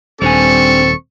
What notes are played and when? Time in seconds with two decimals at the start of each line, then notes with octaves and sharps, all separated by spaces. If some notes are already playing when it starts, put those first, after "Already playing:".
0.22 D#1 G3 C4 D4 A4 G#5 C#6